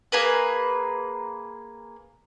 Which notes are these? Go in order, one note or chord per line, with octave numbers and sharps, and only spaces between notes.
A#3 G#4 B4